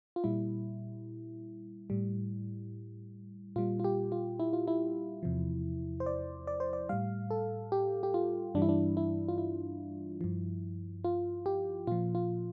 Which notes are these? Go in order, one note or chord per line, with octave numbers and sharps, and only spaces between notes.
F4
A#2 G3 E4
A2 G3
A#2 G3 F4
F4
G4
F4
E4
F4
E4
E2 C3 F3
C5
D5
D5
C5
D5
A2 G3 F5
A4
G4
G4
F4
G2 E3 G3 D4
E4
D4
E4
F4
E4
G2 F3
F4
G4
A#2 F3 F4
F4